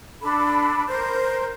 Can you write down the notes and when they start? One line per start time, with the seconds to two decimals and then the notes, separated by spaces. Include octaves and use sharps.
0.21 D4 A4 B5
0.87 A#4 C5 G6